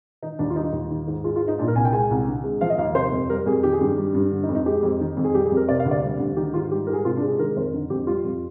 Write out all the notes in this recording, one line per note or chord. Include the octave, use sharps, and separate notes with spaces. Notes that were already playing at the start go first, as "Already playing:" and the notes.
D#3 D#4
D#2 D4
F4
G3 D#4
D#2
D#3
G#2
G#3 F4
F4
G#2
D#4
A#2 D4
A#4
C2 G#5
G5
G#3 G#5
C2
D3
G#3
F3 F5
D#5
D#2 F5
C3 C5
F2
G3 A#4
F2 G#4
D#3 G4
G#4
G2 G4
G3
G2
D3
D#4
F2
D#4
G#3 G4
F2
D#3
F2
G#4
G3 G4
G#4
F2
A#4
C3 D5
F5
D2
D5
G3
D2
D#3 G4
G#2 F4
G3 G4
G#2 A#4
G#4
C3 F4
D4
G#3
G#4
D#3 A#4
F2 C5
D3
F2 G4
G3 F4
F2